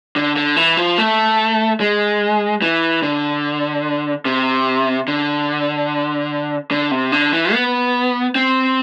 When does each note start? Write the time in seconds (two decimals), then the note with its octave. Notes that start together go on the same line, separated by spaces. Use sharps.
0.16 D3
0.36 D3
0.56 E3
0.77 F3
0.98 A3
1.80 G#3
2.62 E3
3.02 D3
4.25 C3
5.08 D3
6.71 D3
6.91 C3
7.12 D3
7.33 E3
7.53 B3
8.35 C4